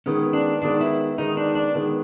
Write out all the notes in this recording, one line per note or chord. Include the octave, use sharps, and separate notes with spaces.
D#3 G#3 B3 C#4
D4
D#3 G#3 B3 D4
E4
D#3 G#3 B3 D#4
D4
D4
D#3 G#3 B3